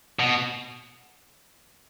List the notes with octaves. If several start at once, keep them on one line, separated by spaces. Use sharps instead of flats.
B2